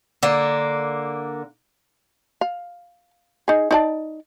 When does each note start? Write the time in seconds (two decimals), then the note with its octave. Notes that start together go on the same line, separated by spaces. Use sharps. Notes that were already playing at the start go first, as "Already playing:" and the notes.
0.23 D3 A#3
2.41 F5
3.48 D#4 G#4
3.71 D#4 D5 A5